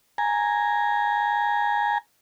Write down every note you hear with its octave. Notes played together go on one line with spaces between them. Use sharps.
G#5 A#5